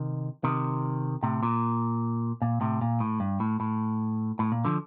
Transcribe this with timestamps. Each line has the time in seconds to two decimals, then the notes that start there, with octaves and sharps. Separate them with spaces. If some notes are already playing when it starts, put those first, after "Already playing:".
Already playing: C3 D#3
0.44 C3 D#3
1.23 A2 C3
1.43 A#2
2.42 A#2
2.61 A2 C3
2.81 A#2
3.00 A2
3.20 G2
3.40 A2
3.60 A2
4.39 A2
4.52 A#2
4.65 D3 F3